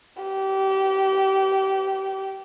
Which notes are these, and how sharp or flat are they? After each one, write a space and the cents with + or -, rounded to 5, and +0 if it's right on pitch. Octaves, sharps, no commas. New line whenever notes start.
G4 -25